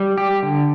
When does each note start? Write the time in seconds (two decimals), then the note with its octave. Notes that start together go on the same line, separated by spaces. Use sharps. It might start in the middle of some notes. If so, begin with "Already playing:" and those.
Already playing: G3
0.18 G4
0.43 D3